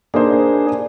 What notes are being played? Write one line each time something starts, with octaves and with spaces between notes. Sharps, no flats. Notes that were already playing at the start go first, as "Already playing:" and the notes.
A#3 D4 D#4 G#4 C5